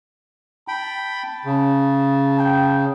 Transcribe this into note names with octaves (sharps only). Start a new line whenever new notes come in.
G5 A5 B5
C#3
G5